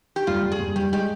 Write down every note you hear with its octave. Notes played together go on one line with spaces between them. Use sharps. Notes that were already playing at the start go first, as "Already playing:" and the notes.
G4
G2 F4
G2
G#4
G2
G2 G4
G#3 G4